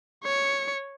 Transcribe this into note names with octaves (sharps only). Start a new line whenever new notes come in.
C#5 C#7